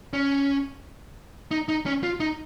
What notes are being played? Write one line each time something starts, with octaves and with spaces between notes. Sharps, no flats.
C#4
D#4
D#4
C#4
F4
D#4